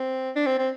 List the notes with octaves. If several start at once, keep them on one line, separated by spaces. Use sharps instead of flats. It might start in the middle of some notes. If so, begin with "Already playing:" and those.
Already playing: C4
D4
C4
C4